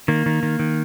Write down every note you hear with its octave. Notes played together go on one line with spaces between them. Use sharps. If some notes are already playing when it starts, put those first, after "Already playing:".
D#3 A#3
D#3
D#3
D#3